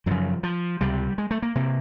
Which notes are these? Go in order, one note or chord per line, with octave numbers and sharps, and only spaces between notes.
F#2 C#3 F3
F3
C#2 C3 G3
G#3
A3
A#3
C3 A#3